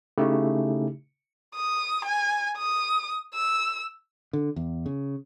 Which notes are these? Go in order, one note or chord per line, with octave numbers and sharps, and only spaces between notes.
C#3 A3 D#4 E4 G4
D#6
G#5
D#6
E6
D3
E2
C#3